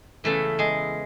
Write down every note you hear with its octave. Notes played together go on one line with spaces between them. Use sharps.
E2 C#3 E3 A3 A4
G#3 G#4